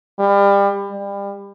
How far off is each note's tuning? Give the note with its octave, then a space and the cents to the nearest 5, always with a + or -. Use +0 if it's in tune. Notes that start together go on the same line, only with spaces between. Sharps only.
G3 +30
G3 +30